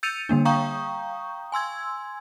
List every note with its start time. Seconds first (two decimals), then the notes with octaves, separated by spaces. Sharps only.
0.03 E6 G6 A6 C#7 D#7 F7
0.29 D3 G3 A#3 D4
0.45 F5 G5 A#5 C#6 D#6 G6
1.52 G#5 C6 E6 G#6